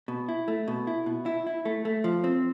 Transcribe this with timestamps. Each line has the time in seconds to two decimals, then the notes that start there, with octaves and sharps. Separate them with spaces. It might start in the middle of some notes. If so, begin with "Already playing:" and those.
0.08 B2
0.29 E4
0.48 A3
0.68 B2
0.87 E4
1.06 B2
1.26 E4
1.47 E4
1.65 A3
1.85 A3
2.04 F3
2.24 C4